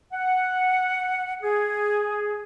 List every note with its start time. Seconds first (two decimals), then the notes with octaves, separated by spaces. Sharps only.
0.12 F#5
1.42 G#4